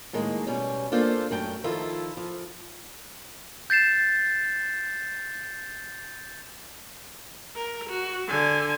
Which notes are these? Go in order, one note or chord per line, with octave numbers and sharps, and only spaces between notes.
A2 D#3 G#3 A#3
B2 G3 C#4
A#3 D4 F4 A4 C5
F#2 A3 G5
D#3 F3 E4 F4 A4
F3
G6 A6 C7 E7
A#4
F#4
D3 G#5